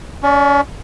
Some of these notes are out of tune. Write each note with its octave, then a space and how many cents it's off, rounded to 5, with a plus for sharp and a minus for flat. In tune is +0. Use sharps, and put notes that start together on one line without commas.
C#4 +35 D5 +0 C#6 +0